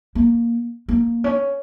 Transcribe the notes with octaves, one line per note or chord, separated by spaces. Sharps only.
A#3
A#3
C#4